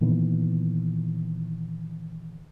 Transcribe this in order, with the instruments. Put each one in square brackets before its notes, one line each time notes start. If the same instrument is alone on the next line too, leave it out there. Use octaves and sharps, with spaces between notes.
[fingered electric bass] A#2 D#3 E3 B3